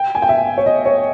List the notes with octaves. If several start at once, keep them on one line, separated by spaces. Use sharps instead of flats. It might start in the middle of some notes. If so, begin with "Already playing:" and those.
Already playing: G5
G#5
G5
E5
C#5
D#5
C#5